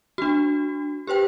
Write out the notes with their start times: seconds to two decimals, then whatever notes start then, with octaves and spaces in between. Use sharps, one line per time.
0.18 D4 F#4
1.07 G4 B4 C5 G5